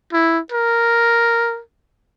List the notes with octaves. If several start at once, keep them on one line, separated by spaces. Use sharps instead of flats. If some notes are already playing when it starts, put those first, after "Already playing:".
E4
A#4